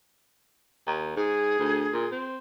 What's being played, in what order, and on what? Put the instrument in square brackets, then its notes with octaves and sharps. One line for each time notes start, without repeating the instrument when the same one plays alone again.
[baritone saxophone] D#2
[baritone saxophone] G#2 [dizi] G#4
[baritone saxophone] D2
A#2
C4